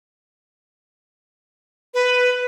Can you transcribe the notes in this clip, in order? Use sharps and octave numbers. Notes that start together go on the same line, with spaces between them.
B4